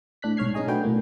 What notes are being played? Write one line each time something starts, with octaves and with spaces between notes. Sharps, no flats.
A2 D4 F#6 B6
B1 G#2 C#5 F6 G#6 C7
C#4 D#4 G#4 D#5 G#5
A3 D4 F#4 B4 G5
B1 A2 A#3